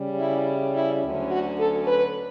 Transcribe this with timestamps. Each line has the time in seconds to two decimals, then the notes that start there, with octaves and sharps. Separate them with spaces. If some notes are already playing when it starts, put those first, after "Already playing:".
Already playing: C#3 G3 C#4
0.19 E4
0.75 E4
1.03 D2 D3 F#3 C#4
1.31 F#4
1.60 A4
1.87 B4